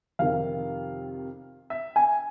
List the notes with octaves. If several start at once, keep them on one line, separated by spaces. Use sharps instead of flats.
F2 C3 D#3 F5
E5
G#5